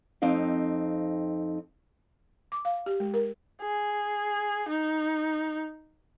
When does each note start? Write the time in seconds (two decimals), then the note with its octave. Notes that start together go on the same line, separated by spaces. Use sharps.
0.22 F2 C4 D#4 F5
2.52 D6
2.65 F5
2.86 G4
3.00 G#3
3.14 A#4
3.62 G#4
4.68 D#4